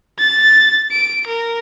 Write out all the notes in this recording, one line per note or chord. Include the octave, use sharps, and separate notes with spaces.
A6
D7
A#4